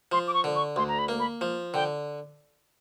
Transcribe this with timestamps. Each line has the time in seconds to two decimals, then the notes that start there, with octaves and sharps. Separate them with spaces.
0.12 F3 C6
0.27 D6
0.34 C#6
0.44 D3
0.55 C#6
0.76 D2 C6
0.88 A#5
0.99 B5
1.09 A#3
1.19 B5
1.41 F3
1.74 D3 G5